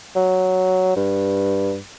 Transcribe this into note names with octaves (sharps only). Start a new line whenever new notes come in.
F#3
G2